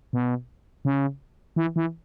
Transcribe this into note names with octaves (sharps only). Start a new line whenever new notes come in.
B2
C#3
E3
E3